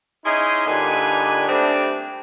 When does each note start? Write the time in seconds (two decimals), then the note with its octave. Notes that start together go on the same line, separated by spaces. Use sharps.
0.25 C#4 D#4 E4 G#4 D#5 C6
0.67 G2 A#2 D3 D#4 B4 G#5
1.48 G3 A3 C4 D4